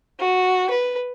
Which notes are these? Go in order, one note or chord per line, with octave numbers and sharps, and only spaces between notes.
F#4
B4